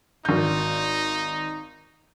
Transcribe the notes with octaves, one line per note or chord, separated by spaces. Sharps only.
G#1 D#4 G6